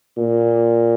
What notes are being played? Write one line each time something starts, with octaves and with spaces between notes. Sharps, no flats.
A#2